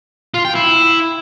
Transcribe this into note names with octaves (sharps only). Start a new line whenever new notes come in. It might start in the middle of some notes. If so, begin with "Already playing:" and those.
F4
G5
E4